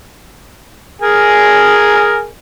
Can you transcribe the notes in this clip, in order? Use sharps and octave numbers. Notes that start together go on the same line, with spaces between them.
G#4 A#4 G#5